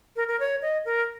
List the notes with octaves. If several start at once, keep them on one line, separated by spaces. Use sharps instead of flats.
A#4
A#4
C#5
D#5
A#4